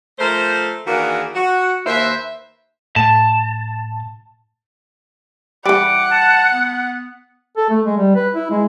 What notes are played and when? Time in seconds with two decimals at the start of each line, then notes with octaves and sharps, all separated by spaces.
0.19 F3 A3 A#4 C5
0.87 D#3 E3 A#3 D4 F#4 G#4
1.35 F#4
1.87 D#2 A#3 B4 C5 E5
2.96 A2 A5
5.66 E3 G3 F#5 D6
6.11 A5
6.52 B3
7.57 A4
7.70 A3
7.86 G#3
7.98 G3
8.16 B4
8.35 E4
8.51 G#3